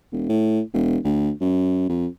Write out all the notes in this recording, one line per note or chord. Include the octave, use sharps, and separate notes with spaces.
E1
A2
E1
D2
F#2
F2